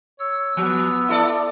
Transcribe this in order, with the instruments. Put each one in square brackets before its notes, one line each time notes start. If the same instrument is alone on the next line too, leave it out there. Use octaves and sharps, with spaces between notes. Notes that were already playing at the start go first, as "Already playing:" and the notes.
[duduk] C#5 [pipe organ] E6
[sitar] F3 [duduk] B3
[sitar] E4 A4 D5